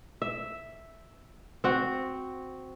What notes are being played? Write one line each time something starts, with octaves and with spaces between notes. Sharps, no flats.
E5
C4 F#4